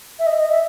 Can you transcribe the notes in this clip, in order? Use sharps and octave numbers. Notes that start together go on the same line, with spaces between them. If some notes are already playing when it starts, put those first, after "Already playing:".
E5
D#5
D#5
E5